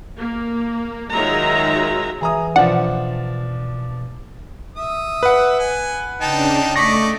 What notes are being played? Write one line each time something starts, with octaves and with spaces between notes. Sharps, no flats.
A#3
D#3 F#3 G#3 F4 E5 A#5
E3 G#4 A#5 D#6
B2 F3 A#3 D4 F#5
E5 D#6
B4 F#5
G#5
C#3 D4 D#4 G5 A5
A3 D5 D#5 C#6 A#6 B6